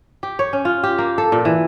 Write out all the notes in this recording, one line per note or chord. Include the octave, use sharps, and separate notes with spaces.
G4
C#5
C#4
F4
G4
A#3
A4
A#2
E3